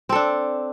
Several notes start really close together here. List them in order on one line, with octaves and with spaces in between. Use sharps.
C4 A4 D4